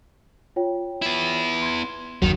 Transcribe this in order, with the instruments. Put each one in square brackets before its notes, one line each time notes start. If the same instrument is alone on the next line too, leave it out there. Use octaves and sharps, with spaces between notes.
[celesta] F4 C#5 G5
[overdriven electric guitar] B3 E4
[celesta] C6 G#6
[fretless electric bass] F#1 D#2 F#3 [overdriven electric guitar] D#3